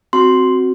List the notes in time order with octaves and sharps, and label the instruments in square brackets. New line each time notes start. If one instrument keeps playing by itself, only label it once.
[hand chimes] C4 F#4 C6